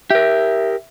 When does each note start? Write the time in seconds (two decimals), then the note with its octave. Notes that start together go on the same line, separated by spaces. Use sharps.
0.10 G4 A#4 E5